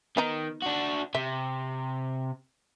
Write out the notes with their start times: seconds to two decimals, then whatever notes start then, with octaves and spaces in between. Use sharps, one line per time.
0.17 D#3 B3 D#4 A#5
0.62 D4 F#4
1.15 C3 E5